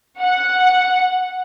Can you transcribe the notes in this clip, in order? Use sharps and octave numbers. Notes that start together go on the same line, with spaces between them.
F#5